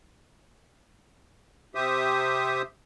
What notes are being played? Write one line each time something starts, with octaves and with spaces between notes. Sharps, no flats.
C3 G4 C5 E5 D#6